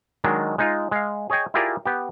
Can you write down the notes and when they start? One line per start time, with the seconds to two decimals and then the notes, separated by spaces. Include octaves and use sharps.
0.24 D#3 F#3 G#3 D4
0.58 G#3 D#4 F4
0.91 G#3 F5
1.30 G#4 C#5 D#5 G5 G#5
1.54 E4 F4 G4 G#4 A#4 D5
1.86 B3 G4